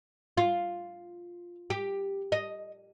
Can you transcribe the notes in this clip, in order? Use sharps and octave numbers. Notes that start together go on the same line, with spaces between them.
F4
G4
D#5